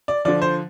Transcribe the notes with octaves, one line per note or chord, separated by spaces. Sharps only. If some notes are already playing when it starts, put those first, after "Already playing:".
D5
D3 F3 D5
C5